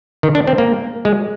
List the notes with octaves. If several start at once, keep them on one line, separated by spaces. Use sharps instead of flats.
D#3
D4
C4
A#3
G#3